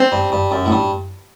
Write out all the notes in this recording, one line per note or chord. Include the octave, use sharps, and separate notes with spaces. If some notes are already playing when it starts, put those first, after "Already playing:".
Already playing: C4
G2
G2
F#2
A2
G2